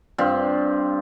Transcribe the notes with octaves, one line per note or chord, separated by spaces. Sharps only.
G2 C4 F4